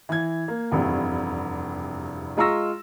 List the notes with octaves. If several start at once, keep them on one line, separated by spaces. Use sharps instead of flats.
E3 G#6
A#3
F1 E2 G2 C3
G#3 F4 A#5 C#6 E6 A#6